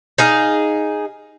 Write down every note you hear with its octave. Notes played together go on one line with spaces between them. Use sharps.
D#4 G#4 F5